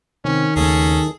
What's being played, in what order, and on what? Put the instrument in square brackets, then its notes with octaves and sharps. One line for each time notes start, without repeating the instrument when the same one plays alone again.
[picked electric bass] C3 [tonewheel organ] D#3 [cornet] C#4
[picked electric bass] D#2 C#3 A3 [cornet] C#4 [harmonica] G#4 A4